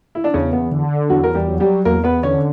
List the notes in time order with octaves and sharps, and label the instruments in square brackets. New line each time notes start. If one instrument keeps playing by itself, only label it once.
[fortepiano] E4
D4
[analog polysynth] E2 [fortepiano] C#3 C#4
[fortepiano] B3
[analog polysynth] D3
[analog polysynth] E2 [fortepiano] F#3 F#4
[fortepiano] A#4
G3 G4
[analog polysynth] F#3
[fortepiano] G3 G4
[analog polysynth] E2 [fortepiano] A#3 A#4
[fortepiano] B3 B4
[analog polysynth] D3 [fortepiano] C#4 C#5